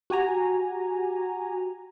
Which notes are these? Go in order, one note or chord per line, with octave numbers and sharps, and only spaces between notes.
F#4 G4 G#5 A#5